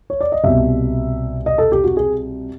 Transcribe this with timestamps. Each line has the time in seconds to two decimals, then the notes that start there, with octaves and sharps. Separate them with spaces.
0.10 C#5
0.21 D5
0.32 D#5
0.44 C2 B2 E5
1.46 D#5
1.58 A4
1.72 G4
1.84 F#4
1.97 G#4